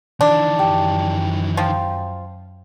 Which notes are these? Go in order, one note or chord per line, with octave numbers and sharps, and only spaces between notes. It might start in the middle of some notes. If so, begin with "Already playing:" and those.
D#3 E3 D4
F#2 G4
F3 F5 G5